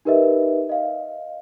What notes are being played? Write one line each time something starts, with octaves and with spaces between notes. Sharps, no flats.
D#4 G4 A#4 B4 D#5 E5
D#5 F5